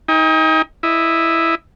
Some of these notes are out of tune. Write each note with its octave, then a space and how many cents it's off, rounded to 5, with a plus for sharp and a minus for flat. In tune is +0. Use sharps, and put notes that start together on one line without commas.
D#4 +30 G5 +45
E4 +0 D#5 -5